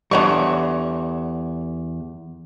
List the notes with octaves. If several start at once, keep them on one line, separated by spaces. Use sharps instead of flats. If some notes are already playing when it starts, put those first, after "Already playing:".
E2 G2 D3 G3 C#5 C#6